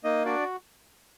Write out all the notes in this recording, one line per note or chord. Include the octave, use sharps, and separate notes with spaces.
A#3 D#4 D#5
D4 F#4 D5